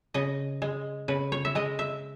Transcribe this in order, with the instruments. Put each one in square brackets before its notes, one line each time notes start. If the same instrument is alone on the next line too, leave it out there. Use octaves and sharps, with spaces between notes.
[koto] C#3 D#5
G#3
C#3 B4
C#5
E5
G#3 D#5
E5